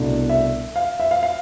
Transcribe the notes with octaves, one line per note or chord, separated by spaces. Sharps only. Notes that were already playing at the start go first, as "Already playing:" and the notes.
Already playing: C2 B2 A3 D4
E5
F5
E5
F5
F5